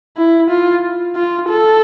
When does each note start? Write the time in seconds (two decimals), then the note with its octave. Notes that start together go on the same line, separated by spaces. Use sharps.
0.17 E4
0.50 F4
1.16 F4
1.49 A4